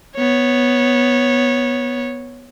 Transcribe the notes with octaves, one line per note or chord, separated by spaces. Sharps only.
B3 C#5